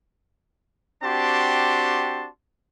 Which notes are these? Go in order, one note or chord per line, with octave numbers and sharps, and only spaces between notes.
C4 D4 F#4 G4 A5 C6